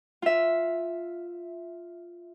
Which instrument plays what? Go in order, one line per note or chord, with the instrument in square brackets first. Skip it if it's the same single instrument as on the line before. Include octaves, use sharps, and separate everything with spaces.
[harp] F4 E5